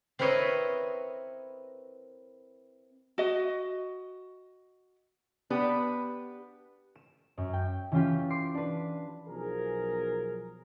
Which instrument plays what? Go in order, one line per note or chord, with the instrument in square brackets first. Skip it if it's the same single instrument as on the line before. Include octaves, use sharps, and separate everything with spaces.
[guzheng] C4 E4 A#4 B4 C#5 D#5
[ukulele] F#4 D#5
[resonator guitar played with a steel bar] B3 D4 G4 B4
[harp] E7
F#2
G5
E3 C#4 F4 G4
C6 D6 C7
D4 B4
[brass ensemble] B1 F3 G#4 A#4